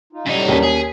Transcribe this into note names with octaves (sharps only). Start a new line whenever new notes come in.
D#4 F4
F#2 A2 F#3 G3 D#4
D#2 C#4 B6
G#4